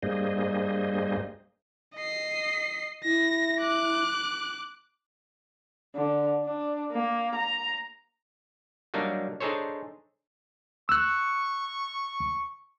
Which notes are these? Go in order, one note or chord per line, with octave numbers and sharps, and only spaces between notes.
G2 G3 A#3 G#4 C5 D#5
D#5 C7
E4 A#6
D6 F#6
D3
D4
A#3
A#5
F#3 G3 A#3 D4 D#4
D4 D#4 G#4 A4 C5 C#5
C#6 E6 F#6